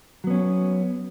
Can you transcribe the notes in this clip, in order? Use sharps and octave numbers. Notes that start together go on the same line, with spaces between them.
F#3 B3 C#4